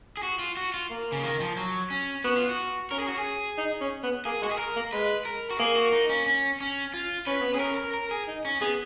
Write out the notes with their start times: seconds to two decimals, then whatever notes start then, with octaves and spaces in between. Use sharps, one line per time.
0.17 G#4
0.23 F#4
0.39 F4
0.57 F#4
0.74 F4
0.90 A#3
1.12 C#3
1.23 D#3
1.40 F3
1.57 F#3
1.90 C#4
2.24 B3 F#4
2.36 F4
2.49 F#4
2.91 C#4 A#4
3.00 G#4
3.08 F#4
3.18 G#4
3.58 D#4
3.81 C#4
4.03 B3
4.25 A#3 G#4
4.42 G#3 F#4
4.51 G#4
4.59 A#4
4.76 A#3
4.93 G#3 B4
5.25 A#4
5.51 F#4
5.59 A#3 G#4
5.76 F#4
5.92 D#4
6.09 C#4
6.26 C#4
6.60 C#4
6.94 F4
7.27 C#4 B4
7.41 B3
7.54 C#4 G#4
7.60 A#4
7.77 A#4
7.94 A#4
8.11 G#4
8.28 D#4
8.45 C#4
8.61 B3 G#4